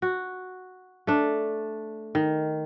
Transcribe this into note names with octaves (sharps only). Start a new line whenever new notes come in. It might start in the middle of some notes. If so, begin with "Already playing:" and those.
F#4
A3 D4
D#3